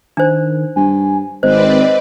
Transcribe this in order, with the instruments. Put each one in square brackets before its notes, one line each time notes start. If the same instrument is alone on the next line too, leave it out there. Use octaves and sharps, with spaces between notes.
[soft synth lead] D#3 [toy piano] D4 C5
[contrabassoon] G2 [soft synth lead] G#5
[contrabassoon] G#1 [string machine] C4 B4 D5 [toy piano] C5 [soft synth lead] D#5